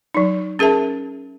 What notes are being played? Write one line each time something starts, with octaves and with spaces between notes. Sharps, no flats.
F#3 D#4
C#4 G#4 A#4 E5 A5